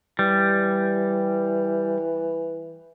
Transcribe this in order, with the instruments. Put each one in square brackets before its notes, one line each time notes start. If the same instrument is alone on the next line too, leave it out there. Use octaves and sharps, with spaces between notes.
[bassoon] E3 [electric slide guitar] G3